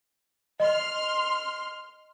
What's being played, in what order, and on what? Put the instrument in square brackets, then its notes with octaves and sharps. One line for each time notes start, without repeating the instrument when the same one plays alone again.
[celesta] D#5 [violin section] C6 F6